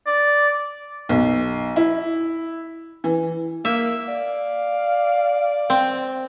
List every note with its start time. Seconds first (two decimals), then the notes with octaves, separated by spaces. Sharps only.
0.07 D5
1.09 B1
1.76 E4
3.04 E3
3.65 A#3 E5
4.08 D5 F5
5.70 C4